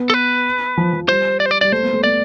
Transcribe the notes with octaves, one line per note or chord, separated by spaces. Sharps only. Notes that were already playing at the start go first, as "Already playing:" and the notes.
Already playing: B3
A4
B4
F3
F3
G3 C5
D5
C5
D5
G3 D5
A3 C5
B3
A3
B3 D5